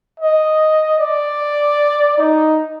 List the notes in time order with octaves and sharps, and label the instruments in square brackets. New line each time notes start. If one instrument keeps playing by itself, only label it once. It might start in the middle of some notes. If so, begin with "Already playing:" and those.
[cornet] D#5
D5
D#4